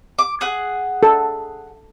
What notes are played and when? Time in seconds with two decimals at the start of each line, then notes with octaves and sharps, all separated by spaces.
0.19 D6
0.41 G#4 F#5
1.03 A4